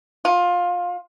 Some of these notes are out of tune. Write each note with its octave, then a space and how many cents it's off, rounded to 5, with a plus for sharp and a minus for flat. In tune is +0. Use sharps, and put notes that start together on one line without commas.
F4 +20